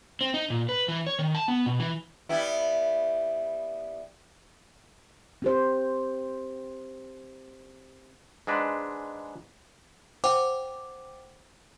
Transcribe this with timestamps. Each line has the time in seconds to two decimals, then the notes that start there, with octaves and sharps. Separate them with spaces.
0.21 C4
0.34 D#4
0.50 A#2
0.69 B4
0.88 E3
1.07 C#5
1.19 D#3
1.35 A5
1.48 B3
1.66 B2
1.80 E3
2.29 G3 B3 E4
5.42 C4 G4 C5
8.47 G#2 G#3 D4 B4
10.24 C5 F#5 G5 D6